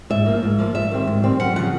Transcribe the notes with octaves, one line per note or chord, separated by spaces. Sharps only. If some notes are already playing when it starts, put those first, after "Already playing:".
G#2 E5
F3 A#3
G#2
F3 A#3
G#2 E5
D#3 G3 C4
G#2
D#3 G3 C4
F#2 F#5
C#3 F3 F#5